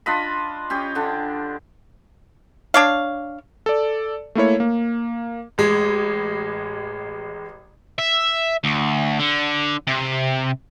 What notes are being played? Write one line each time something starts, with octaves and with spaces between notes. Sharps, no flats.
D4 F4 D#5 B5
C#4 G4 G#4
D3 D4
D4 C#5 F5
A4 D5
A3 A#3 E4 C#5
A#3
A1 G#3
E5
D2
D3
C3